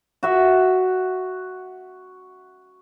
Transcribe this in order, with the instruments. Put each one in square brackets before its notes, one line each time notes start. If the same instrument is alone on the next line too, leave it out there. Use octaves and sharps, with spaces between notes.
[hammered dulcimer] F#4 E5